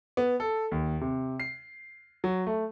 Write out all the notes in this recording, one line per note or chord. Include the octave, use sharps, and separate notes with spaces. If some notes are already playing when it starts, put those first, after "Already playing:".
B3
A4
D#2
C3
C7
F#3
A3